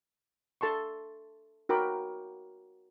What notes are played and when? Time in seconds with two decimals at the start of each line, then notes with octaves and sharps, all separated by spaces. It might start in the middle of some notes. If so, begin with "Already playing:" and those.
0.61 A4 A5 C6 C#6
1.69 F#4 A#4 G5 B5 D6